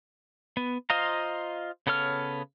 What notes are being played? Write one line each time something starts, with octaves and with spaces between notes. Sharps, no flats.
B3
F4 C5 D#5 F5 A#5
C#3 B3 A4 C#5 F6